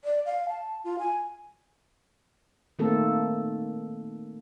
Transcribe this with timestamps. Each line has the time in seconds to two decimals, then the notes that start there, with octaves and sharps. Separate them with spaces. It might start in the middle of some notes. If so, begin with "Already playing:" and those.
0.04 D5
0.25 F5
0.49 A5
0.84 F4
0.99 G#5
2.79 D#3 A3 A#3 C4 A4